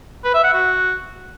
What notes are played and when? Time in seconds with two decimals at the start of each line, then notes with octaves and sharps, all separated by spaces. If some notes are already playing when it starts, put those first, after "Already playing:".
0.24 B4
0.34 E5
0.44 F#5
0.54 F#4